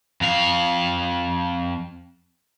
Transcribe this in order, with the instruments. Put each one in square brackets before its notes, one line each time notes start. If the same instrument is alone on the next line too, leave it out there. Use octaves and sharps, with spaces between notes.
[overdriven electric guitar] F2 F5